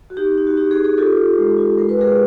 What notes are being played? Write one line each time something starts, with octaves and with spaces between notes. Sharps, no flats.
F#4
D#4 G4
D#4
F#4
D#4 G4
F#4 G#4
D#4
F#4 G#4
F4 G4 A4
F4
G#3
F4
G#3 A#4
B4
G#3 G#4 A#4